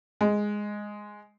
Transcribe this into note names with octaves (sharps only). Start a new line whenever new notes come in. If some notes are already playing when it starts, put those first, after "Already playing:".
G#3